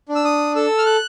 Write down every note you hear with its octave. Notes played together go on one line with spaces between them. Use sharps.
D4
E6
D#6
A4 E6
F6
F#6